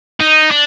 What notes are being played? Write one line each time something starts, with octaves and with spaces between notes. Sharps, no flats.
D#4
D4